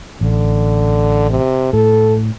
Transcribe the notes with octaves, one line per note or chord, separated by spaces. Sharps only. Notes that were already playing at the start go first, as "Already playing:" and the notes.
A1 D3
C3
A2 A4